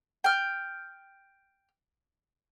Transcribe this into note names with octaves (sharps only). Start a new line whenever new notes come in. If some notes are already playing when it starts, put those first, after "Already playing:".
G5 F6